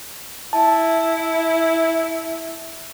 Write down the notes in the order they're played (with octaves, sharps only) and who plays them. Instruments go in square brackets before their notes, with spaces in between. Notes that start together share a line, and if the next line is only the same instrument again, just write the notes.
[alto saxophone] E4 [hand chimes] A5